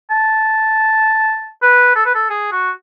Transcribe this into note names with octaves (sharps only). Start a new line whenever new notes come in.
A5
B4
A4
B4
A4
G#4
F#4